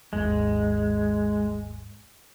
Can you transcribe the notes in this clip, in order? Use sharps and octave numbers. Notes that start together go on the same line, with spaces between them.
G#1 D#2 G#2 G#3